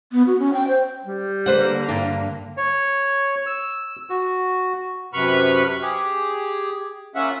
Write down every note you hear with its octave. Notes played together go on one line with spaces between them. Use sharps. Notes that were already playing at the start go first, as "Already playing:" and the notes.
B3
F#4
C#4
G5
C5
G3
D3 A#3 B4 C5 F#5
G2
C#5
E6
F#4
F#2 C3 B4 B5 C#6 F6
G4 G#4
A#3 C#4 F4 E5 F#5